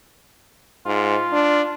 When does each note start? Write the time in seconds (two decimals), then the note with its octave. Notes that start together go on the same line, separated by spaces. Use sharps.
0.86 G#2 F4
1.32 D4